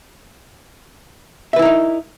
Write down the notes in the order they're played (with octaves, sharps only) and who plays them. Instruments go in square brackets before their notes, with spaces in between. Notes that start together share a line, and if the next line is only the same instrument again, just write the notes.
[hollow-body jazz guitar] E5
B4
E4
A#4
D#4